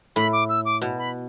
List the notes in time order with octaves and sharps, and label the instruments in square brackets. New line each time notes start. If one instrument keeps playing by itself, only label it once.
[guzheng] A2 [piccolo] B5
[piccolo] D6
E6
D6
[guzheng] B2
[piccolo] B5